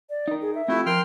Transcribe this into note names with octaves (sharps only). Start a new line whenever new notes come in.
D5
D#4 A#4
G#4
E5
A3 C4 E4 F4 G4
F3 A#4 G5 C6 F6